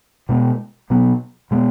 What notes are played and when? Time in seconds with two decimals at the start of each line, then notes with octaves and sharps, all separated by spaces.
0.29 B2 G#3 B3
0.90 B2 F#3 B3
1.51 B2 G#3 B3